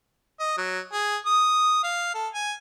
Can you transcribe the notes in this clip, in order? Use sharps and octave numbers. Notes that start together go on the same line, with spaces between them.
D#5
F#3
G#4
D#6
F5
A4
G#5